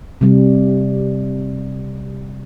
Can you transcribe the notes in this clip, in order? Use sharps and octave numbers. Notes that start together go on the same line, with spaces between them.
C3 G3